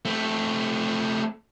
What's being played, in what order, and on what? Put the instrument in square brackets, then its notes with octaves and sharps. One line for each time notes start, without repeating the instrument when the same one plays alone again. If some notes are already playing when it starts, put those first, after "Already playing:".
[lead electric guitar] A3 C4